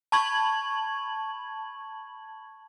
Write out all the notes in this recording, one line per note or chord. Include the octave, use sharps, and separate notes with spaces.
A5 B5 C#6 G#6 F#7